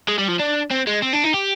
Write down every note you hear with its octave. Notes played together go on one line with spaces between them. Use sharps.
G#3
G3
F3
D4
C4
G#3
C4
D4
D#4
G4